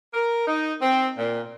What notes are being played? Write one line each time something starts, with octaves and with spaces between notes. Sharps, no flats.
A#4
D#4
C4
A#2